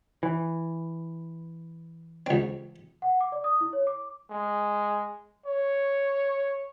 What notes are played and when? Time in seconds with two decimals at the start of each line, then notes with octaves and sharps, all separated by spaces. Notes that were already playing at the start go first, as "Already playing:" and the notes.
0.23 E3
2.26 C#2 C4
3.02 F#5
3.21 D6
3.32 D5
3.44 D#6
3.61 E4
3.73 C#5
3.87 D6
4.31 G#3
5.46 C#5